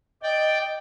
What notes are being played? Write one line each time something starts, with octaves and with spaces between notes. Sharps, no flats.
D5 D#5 G5